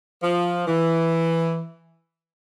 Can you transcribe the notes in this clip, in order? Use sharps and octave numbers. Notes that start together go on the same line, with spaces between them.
F3
E3